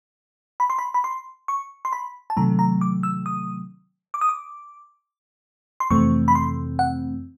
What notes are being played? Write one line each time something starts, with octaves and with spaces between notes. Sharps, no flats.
B5
C6
B5
B5
C6
C#6
C6
B5
A5
C3 D#3 F#3 A3 A#5
A#5
D6
E6
D#6
D6
D#6
D6
C6
F2 C3 E3 A3 C4 C#6
B5
C6
F#5